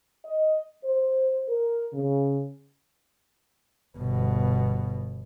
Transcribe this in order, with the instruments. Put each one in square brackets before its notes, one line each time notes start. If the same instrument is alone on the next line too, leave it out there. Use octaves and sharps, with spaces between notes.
[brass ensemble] D#5
C5
A#4
C#3
[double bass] G1 B2